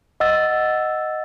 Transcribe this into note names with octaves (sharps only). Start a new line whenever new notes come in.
D#5 F#5 E6 A6